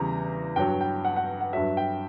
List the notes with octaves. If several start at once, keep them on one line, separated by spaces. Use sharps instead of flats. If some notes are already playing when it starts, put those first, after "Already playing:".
Already playing: E2 C#3 G3 A#5
G2 F#3 G5
G5
F#5
F#5
F#5
G2 F#3 E5
G5